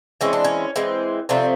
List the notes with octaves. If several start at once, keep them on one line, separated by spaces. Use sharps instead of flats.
E3 G#3 C4 C#4
D4
C#4
E3 G#3 C4
C3 F3 A3 C4 D4